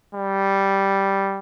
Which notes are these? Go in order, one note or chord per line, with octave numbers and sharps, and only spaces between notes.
G3